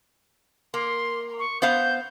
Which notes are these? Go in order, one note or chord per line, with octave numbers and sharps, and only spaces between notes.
A#3 C6
C#6
B3 C5 F5 G6